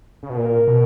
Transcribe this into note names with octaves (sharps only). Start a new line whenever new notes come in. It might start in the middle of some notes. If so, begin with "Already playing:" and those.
C#3
B2
A#2 A#4
B2